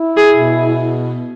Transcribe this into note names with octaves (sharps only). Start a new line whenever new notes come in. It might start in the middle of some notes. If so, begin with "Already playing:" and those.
Already playing: E4
G#4
B2